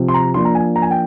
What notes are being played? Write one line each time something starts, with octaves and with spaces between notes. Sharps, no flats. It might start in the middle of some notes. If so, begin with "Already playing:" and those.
Already playing: C3 F3 C4
C6
A#5
F3 A#3 D4 C6
A#5
G#5
A#5
G#5
G5